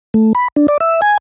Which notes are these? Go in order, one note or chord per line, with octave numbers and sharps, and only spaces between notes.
A3
B5
D4
D5
E5
G#5